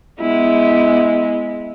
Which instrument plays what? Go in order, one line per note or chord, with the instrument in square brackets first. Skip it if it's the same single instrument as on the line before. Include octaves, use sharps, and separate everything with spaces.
[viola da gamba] G#3 B3 E4